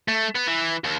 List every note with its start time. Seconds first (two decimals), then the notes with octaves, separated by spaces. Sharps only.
0.08 A3
0.35 B3
0.48 E3
0.84 D#2